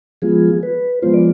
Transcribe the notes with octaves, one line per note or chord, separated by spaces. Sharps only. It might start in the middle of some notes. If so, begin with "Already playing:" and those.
F3 G#3 B3 F4 G#4
B4
F3 G#3 B3 F4 C5
D5